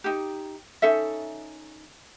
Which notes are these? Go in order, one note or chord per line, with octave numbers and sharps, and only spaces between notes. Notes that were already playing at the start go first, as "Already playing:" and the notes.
D#4 G4
C#4 D#4 A4 E5